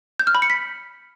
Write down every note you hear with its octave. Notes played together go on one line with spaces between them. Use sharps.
G6
F6
B5
C#7
B6